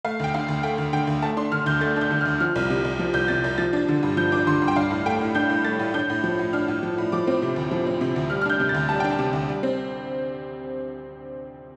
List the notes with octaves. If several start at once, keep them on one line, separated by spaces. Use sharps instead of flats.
A3 F5
D2 G5
D3 F5
D2
A3 G5
D2
D3 G5
D2
A3 A5
D4 C6
D3 F6
D2 G6
A3 A6
D4
G6
D3
F6
D2
F3 F6
C2
C3
C2
F3
C2 G6
C3 A6
C2
F3 A6
D4 A6
D3
G2
F3 G6
D4 D6
D3 C6
G2
G5
D4 F5
A2
A3 G5
A2
D4 G6
A2
A3 A6
A2
D4 G6
A2
F3
A2
D4 F6
A2
F3
A2
F3 D6
C4
C3
D2
F3
C4
C3
D2
G3 F6
F6
D4 G6
C3
A6
D2
G3 A5
D4 G5
A5
C3
D2
G3
C4